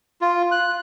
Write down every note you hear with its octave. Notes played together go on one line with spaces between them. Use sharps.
F4
F#6